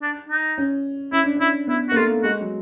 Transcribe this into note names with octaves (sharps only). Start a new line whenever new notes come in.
D4
D#4
C#4
C#4 E4
D4
C#4 E4
B3 E4
F#4
A#3
A3 F4
G#3 F#4
F#3